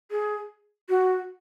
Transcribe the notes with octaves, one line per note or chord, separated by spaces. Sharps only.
G#4
F#4